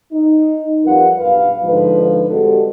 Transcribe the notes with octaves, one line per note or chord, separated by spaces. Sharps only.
D#4
F2 G3 F4 A#4 B4 F#5
B1 G2 B4 F5
G#2 D3 F3 D#4 B4
G3 G#3 C4 F#4 G4 A4